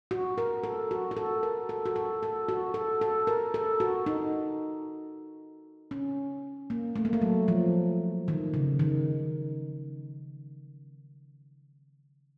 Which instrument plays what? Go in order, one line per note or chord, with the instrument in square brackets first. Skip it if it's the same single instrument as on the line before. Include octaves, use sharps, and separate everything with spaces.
[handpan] F#4
A#4
A4
F#4
F#4
A4
A#4
A4
F#4
A4
A4
F#4
A4
A4
A#4
A4
F#4
D#4
C#4
A#3
A3
A#3
A3
F#3
F3
D#3
C#3
D#3